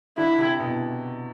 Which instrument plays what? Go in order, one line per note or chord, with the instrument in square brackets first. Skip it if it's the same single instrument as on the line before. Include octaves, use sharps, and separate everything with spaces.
[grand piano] D3 [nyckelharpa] E4
[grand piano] C3
B2